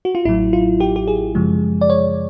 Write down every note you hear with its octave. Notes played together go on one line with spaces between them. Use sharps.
F#4
F4
A1 A2 F#3 E4
F4
G4
G4
G#4
F#2 C#3 F3 G#3
D5
C#5